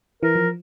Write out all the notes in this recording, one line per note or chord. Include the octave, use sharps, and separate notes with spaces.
E3 A#4
F3